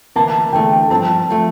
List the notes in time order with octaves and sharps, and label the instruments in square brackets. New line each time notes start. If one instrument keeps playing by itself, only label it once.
[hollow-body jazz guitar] D2 C3 E3 A#3 [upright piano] A5
[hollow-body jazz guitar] E2 D3 A3 [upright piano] G5
[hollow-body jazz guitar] G2 F3 C4 [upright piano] A5
[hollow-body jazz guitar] F3 A3